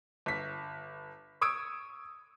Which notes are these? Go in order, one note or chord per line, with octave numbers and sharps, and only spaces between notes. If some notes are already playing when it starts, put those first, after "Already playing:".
G1 B6
C#6 D#6 E6 G#6 D7